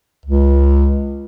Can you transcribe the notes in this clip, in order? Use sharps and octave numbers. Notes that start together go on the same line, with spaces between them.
C#2